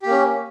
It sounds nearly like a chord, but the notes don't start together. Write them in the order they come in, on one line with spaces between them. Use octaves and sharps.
G4 A#3 C#4